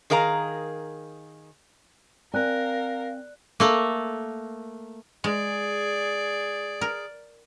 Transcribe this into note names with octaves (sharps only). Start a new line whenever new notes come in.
D#3 G#4 A#4 F5 A#5
C4 A#4 D5 F5 G#5 F#6
A3 A#3
G#3 G#4 D5
A#4